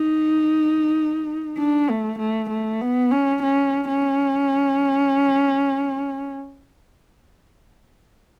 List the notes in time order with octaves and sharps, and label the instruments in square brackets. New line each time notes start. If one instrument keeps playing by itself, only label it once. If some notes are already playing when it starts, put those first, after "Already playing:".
Already playing: [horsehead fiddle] D#4
D4
A3
A3
A3
B3
C#4
C#4
C#4